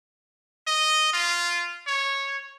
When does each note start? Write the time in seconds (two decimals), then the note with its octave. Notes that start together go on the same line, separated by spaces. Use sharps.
0.67 D#5
1.13 F4
1.87 C#5